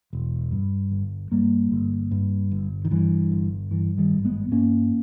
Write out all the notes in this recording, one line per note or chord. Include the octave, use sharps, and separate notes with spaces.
E1
G2
G1
G2 G3 A#3
G1
G2
G1
D#3
G2 E3
G1
G2 E3
D#3 G3
G#1
G#3 B3
G2 A#3 C#4